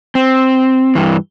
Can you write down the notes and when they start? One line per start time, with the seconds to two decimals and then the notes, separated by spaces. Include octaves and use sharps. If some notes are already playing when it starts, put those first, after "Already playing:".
0.15 C4
0.95 G2 E3